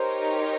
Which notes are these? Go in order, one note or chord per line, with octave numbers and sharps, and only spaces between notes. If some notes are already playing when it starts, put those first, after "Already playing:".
Already playing: D#4 G4 A#4 C5 C#5